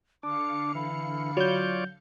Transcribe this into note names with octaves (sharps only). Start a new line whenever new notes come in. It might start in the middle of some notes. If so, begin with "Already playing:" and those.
D3 D4 F5 D6 C#7
E3 B5
F#3 F4 C#5 D5 G6